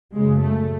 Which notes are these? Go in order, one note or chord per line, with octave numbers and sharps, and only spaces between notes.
F#2 C#3 G#3
A3